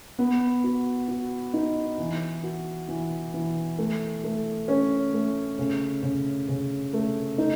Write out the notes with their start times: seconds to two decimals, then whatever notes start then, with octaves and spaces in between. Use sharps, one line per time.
0.19 B3
0.64 F#4
1.08 F#4
1.54 D#4
1.98 E3
2.43 F#4
2.88 E3
3.34 E3
3.78 A3
4.24 A3
4.68 C#4
5.14 A3
5.59 C#3
6.02 C#3
6.48 C#3
6.93 A3
7.38 D#4